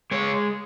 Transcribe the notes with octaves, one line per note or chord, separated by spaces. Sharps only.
G#3 C#5